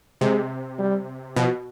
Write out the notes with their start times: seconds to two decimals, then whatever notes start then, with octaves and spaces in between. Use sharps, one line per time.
0.21 C3 G#3
0.79 G3
1.36 B2 F3